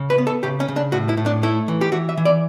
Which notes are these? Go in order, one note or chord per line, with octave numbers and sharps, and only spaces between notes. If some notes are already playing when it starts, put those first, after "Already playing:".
Already playing: C#3
B4
B3
A4
C#3 G4
C#4
C#3
D4
A2 F#4
E4
A2
D4
A3 E4
E3
G4
E3 F#4
E5
E3
D5